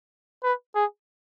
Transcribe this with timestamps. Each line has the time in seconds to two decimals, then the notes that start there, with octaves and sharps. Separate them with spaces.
0.44 B4
0.75 G#4